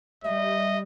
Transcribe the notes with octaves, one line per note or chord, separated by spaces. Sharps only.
G3 D#5 E5